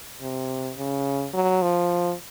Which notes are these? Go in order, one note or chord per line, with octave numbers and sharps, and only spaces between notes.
C3
C#3
F#3
F3